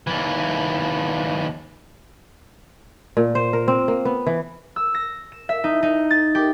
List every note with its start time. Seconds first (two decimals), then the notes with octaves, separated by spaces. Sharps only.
0.07 D#2 E3
3.17 A#2
3.35 C5
3.53 A#4
3.68 C4
3.88 A#3
4.05 B3
4.27 E3
4.76 E6
4.95 A#6
5.32 E7
5.49 E5
5.64 D#4
5.83 D#4
6.11 A6
6.35 G4